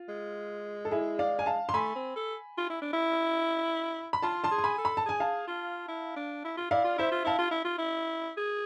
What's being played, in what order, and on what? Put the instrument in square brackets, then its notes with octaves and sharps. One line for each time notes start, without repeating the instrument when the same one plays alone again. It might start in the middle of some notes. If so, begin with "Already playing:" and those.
Already playing: [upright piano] F4
[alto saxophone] G#3
[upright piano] A4
E4 G#4
D5 F5
G#5
F5 A5
C6
[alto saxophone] A3 [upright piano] G#5 B5
[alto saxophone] C4
A4
F4
E4
D4
E4
[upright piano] B5
[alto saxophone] F4 [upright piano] A5 C6
[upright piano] A5 C6
[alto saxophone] G#4
[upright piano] C6
G#5 B5
[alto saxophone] A4
[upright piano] B5
A5
[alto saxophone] G#4 [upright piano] G#5
[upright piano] F5 A5
[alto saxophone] F4
E4
D4
E4
F4
[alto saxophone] E4 [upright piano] D5 F5
[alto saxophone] F4
[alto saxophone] E4 [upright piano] C5 E5
[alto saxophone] F4
[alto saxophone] E4 [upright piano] F5 A5
[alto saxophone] F4
E4
F4
E4
G#4